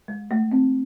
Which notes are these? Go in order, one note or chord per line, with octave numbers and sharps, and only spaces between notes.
G#3
A3
C4